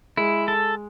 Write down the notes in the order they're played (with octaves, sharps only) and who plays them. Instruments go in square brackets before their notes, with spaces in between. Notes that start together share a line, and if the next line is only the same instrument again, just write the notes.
[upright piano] G#3 [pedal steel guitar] E4
[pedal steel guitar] A4